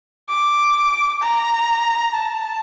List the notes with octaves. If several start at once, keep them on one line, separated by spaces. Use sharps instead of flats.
D6
A#5
A5